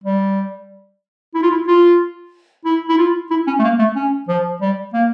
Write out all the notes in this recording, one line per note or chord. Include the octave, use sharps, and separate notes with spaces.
G3
E4
F4
E4
F4
E4
E4
F4
E4
C#4
A3
A#3
A3
C#4
F3
G3
A#3